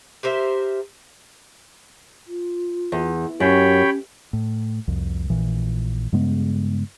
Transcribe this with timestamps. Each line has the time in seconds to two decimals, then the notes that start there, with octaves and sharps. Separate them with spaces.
0.23 G4 A#4 C5 E5
2.28 F4
2.92 E2
3.40 F#2 C#4 G4 C#5 G5 B5
4.33 A2
4.88 C2 F2
5.30 A#1 A#2 E3
6.12 G2 C#3 G#3 B3